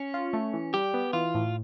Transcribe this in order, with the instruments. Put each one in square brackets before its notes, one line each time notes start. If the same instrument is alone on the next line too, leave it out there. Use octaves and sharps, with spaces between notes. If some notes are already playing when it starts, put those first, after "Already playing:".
Already playing: [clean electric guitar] C#4
[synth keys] F4
A3
E3
[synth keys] G3 [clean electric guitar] G4
[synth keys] B3
[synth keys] E3 [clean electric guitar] F4
[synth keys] A2